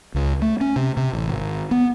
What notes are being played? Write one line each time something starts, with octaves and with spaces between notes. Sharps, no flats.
C#2
A3
C#4
C3
C3
A1
G#1
B3